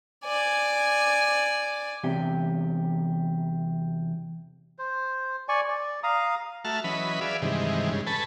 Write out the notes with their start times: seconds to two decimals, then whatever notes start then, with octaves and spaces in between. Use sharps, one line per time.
0.24 D5 G#5
2.04 E2 C3 G4
4.78 C5
5.48 D5 G#5 C#6
5.68 D5
6.03 F5 A#5 D#6
6.65 A3 F#4 E5 A5 F6
6.84 E3 F#3 C#4 B4 D#5 B5
7.21 G#4 B4 D5 E5 F5
7.42 G2 C3 D#3 E3 G#3
7.91 G2 C#3 G#3
8.07 A4 B4 G#5 A5 B5 C#6